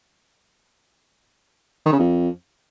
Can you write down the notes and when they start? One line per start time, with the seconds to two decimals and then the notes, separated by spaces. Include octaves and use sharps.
1.86 D#3
1.93 C#3
1.99 F2